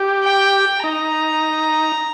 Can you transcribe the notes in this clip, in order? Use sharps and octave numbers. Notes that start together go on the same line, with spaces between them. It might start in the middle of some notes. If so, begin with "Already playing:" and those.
Already playing: G4
G5
D#4 A#5